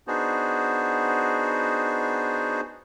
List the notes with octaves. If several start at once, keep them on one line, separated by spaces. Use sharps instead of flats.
B3 D4 D#4 F#4 G#4 C5